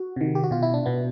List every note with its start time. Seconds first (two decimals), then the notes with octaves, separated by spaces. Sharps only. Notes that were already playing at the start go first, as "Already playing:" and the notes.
Already playing: F#4
0.16 C3 D#3
0.35 G4
0.43 F#4
0.51 B2 F4
0.62 E4
0.74 D4
0.86 B2 B3